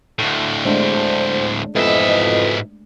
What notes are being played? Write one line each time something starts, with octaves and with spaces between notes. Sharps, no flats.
D2 A2
G#3 A3 D4 C5
F2 G#2 B2 E3 D#5 E5